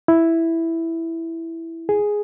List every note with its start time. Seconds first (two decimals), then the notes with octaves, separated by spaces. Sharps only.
0.08 E4
1.89 G#4